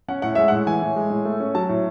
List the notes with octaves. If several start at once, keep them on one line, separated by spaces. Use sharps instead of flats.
C#4 F#5
A2 F#5
G#3 E5
A2 F#5
E3 G#5
A2
G#3
A2
A3
C#4
F#3 A5
A2